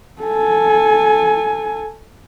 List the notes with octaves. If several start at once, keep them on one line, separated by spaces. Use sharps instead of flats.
A4 G#5